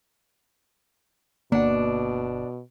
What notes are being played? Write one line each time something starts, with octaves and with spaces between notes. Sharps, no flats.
G1 B2 A#3 D4 F#5